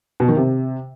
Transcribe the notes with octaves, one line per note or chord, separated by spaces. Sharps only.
B2
D#3
C3